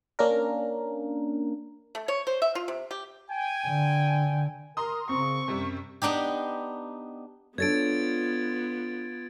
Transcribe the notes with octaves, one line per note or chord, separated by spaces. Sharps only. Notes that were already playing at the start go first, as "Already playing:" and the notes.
A#3 C#4 D4 A#4
A3
C#5
C5
E5
F4
C3
G4
G5 G#5
D3
A#4 A#5 C6 D#6
C#3 C4 C#6
F#2 C3 G3
B3 D4 D#4 G4
B3 D4 F4 A4 C#5 G#6 A6 D7